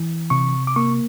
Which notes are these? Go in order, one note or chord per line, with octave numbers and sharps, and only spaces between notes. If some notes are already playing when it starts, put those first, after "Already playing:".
Already playing: E3
C3 C#6
D6
A#3 C#6